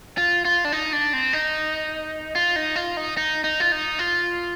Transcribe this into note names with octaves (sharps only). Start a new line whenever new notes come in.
F4
F4
D4
D#4
D4
C4
D#4
F4
D#4
F4
D#4
D#4
D#4
F4
D#4
F4